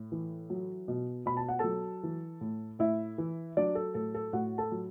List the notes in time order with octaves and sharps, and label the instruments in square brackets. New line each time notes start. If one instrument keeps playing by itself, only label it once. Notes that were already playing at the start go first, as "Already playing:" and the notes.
Already playing: [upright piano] A2
E3
F#3
B2
B2 B5
A5
F#5
F#3 A4 A5
E3
A2
A2 E4 E5
E3
F#3 D4 D5
A4
A2 A4
A4
A2 F#4 F#5
A4 A5
F#3